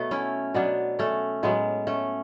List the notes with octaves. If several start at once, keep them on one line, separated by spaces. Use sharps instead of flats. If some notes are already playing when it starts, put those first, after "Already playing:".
Already playing: B2 F#3 A3 B3
C#4 E4
B2 F#3 B3 D4
A3 C#4
A2 F#3 G#3 B3
A3 C#4